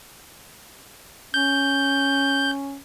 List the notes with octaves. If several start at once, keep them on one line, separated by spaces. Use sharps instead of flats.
C#4 G6